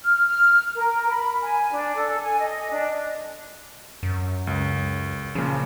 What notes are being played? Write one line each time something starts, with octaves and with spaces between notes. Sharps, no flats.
F6
F6
A#4
B5
G#5
D4
A4
G#5
D#5
D4
F#2
C#2
A#2 C#3 F3